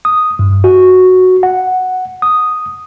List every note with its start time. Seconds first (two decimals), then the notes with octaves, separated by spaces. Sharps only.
0.05 D#6
0.39 G2
0.64 F#4
1.43 F#5
2.22 D#6